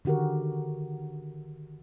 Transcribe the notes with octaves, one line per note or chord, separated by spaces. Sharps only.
D3 D#3 F#4 G4 A#4